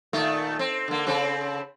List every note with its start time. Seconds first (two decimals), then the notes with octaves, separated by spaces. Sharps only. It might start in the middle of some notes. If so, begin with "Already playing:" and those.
0.13 A#2 D#3 A3
0.59 C4
0.88 D3 A#3
1.07 C#3 C4 A4